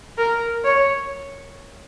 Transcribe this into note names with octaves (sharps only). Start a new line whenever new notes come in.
A#4
C#5